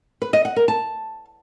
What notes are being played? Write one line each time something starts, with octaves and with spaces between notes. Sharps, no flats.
B4
D#5
F#5
A#4
A5